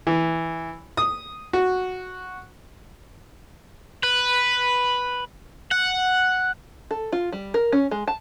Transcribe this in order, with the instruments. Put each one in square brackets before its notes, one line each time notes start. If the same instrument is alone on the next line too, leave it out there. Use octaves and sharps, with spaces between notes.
[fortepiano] E3
D#6
F#4
[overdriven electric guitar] B4
F#5
[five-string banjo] A4
F4
G3
A#4
C#4
G#3
A5